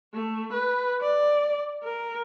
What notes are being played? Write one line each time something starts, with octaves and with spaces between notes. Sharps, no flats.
A3
B4
D5
A#4